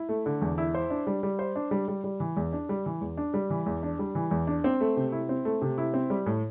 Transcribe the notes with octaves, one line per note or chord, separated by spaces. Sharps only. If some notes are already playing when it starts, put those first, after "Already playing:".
Already playing: E4
A3
D3
E2
E4
C5
D4
G3
G3
C5
D4
G3
G3
G3
E3
E2
D4
G3
E3
E2
D4
G3
E3
E2
D4
G3
E3
E2
D4
C4
A3
C3
E4
C4
A3
C3
E4
C4
G3
A2